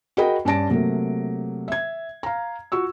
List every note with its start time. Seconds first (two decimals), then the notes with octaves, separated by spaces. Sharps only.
0.17 F#4 G#4 A#4 D#5 G5 B5
0.45 G2 C#4 D4 A5 A#6 D7
0.69 C3 F#3 A3 A#3
1.68 E5 G#6
2.23 F5 A#5
2.72 F4 F#4 C#6 E6